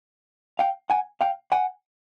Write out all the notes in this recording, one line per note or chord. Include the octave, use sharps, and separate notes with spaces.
F5 G5
F#5 G#5
F5 G5
F#5 G#5